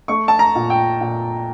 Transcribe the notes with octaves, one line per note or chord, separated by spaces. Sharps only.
A3 C#6
A5
A#5
A#2
G5
A#2